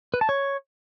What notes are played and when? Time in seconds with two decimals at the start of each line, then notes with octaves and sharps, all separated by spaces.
0.14 B4
0.21 A5
0.29 C#5